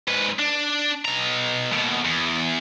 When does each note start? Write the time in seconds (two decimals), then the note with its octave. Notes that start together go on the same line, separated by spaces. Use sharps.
0.08 G#2 B4
0.39 D4
1.05 B2 A#5
1.72 D#2 B2
2.05 E2